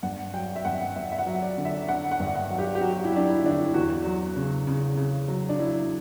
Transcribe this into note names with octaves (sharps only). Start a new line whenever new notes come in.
G2 F#5
F#3 G5
E5
G2 F#5
G2 E5
E5
F#5
F#3
D5
D3
E5
D3 F#5
F#5
G2
F#5
F#3
G4
G4
F#3 F#4
E4
F#3 D4
E4
D3 D4
E4
E2 F#4
F#3
C#3
C#3
C#3
F#3
D4
F#3 E4